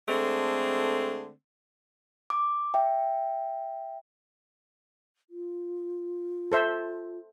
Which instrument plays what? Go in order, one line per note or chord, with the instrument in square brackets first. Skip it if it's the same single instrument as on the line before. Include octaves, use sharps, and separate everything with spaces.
[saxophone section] D3 G#3 A3 C4
[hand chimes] D6
E5 G5
[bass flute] F4
[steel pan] A4 C5 E5